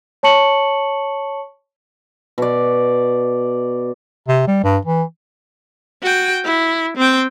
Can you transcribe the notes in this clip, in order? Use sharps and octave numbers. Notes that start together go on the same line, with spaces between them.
C#5 A5 C#6 C#7 F#7
B2 D5
C3
G3
G2
E3
F#4 G5
E4
C4 G5